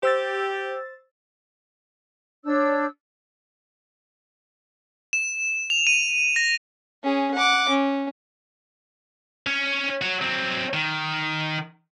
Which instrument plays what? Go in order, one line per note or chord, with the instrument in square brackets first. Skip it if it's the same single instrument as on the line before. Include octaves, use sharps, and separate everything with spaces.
[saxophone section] G4 [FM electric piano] C5 E6 A6
[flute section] D4 C#5 E6 G6
[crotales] E7
F7
D#7
A#6
[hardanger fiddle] C#4 G#4
F#5 D6
C#4
[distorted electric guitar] C#4 C#5
F#4 C#5
F#3 C4
D#3